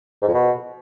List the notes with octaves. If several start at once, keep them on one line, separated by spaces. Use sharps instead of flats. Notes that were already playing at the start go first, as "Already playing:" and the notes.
G#2
F2
B2